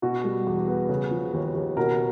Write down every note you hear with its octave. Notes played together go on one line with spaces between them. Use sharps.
B2 F#4
G3
E2
B3
C#3
F3
D#2
D#2
B2 A#4